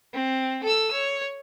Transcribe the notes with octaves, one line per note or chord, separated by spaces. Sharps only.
C4
A4 E6
C#5